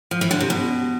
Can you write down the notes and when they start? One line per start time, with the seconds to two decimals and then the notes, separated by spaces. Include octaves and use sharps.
0.11 F3
0.21 E3
0.31 D3
0.40 C3
0.50 B2